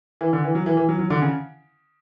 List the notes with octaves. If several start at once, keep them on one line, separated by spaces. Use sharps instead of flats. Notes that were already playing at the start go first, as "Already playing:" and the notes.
E3
D3
E3
F#3
E3
E3
F#3
F#3
D3
C#3